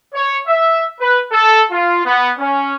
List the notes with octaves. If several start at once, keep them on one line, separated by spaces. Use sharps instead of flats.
C#5
E5
B4
A4
F4
B3
C#4